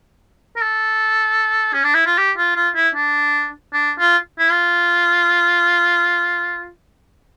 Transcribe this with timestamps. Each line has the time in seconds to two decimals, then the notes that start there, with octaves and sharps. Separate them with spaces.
0.56 A#4
0.62 A4
1.73 C#4
1.84 D4
1.95 E4
2.06 F4
2.18 G4
2.37 F4
2.56 F4
2.75 E4
2.95 D4
3.73 D4
3.99 F4
4.39 E4
4.51 F4